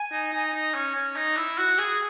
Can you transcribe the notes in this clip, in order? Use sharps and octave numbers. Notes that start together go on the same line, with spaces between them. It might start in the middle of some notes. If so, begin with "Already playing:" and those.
Already playing: G#5
D#4
D#4
D#4
C#4
C#4
D#4
E4
F#4
G#4